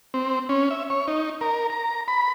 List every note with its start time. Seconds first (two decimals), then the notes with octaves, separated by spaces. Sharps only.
0.14 C4
0.49 C#4
0.71 E5
0.90 C#5
1.07 D#4
1.41 A#4
1.70 A#5
2.08 B5